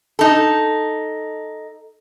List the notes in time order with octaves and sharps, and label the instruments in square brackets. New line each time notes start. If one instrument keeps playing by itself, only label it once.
[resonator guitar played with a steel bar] D#4 A4